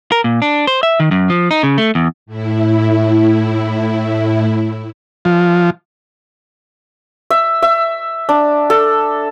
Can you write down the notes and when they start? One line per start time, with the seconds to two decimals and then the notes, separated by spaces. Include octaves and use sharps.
0.12 A#4
0.24 A#2
0.42 D4
0.67 C5
0.83 E5
1.00 D#3
1.11 F#2
1.30 F3
1.51 D#4
1.63 C#3
1.78 A3
1.95 E2
2.26 A2 E4
5.25 F3
7.30 E5
7.62 E5
8.29 D4
8.70 A4